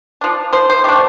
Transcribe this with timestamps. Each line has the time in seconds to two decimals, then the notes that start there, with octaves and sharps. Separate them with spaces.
0.21 F3 D4
0.53 F3 C5
0.70 C5
0.84 A3 D4 G4